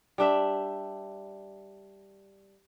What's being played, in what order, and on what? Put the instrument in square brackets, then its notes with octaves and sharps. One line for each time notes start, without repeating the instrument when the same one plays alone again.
[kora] G3 D4 E5